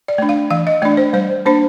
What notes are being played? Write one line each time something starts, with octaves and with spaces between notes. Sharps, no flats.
D5
A3 D4
F5
E3 F5
D#5
A3 D4 D5
C5
G3 C5
A#3 D4 C5